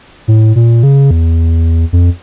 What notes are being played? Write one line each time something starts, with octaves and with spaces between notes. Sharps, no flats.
A2
A#2
C#3
E2
F2